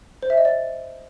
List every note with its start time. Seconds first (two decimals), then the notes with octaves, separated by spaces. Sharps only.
0.23 C5
0.30 E5
0.38 D#5
0.45 D5